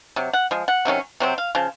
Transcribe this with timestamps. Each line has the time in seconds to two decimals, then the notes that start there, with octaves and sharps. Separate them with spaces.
0.16 C3 F#3
0.33 F#5
0.51 F3 G#3
0.68 F#5
0.85 C3 D#3 F#3 C#4
1.20 C3 F#3 C4
1.38 F5
1.55 C#3 F3